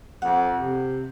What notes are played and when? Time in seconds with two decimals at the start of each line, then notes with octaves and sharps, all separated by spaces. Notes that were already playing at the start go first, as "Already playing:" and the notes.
0.22 F2 F#5
0.56 C3